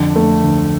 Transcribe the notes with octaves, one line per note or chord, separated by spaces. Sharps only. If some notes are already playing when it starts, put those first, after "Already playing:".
Already playing: F2 D3
A3
D2